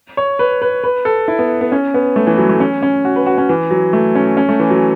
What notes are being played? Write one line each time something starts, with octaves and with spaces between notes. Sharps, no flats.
C#5
B4
B4
B4
A4
E4
B3
B3
C#4
B3
A3
E3
F#3
A3
C#4
C#4
F#4
B4
F#4
C#4
E3
F#3
A3
C#4
C#4
A3
E3
F#3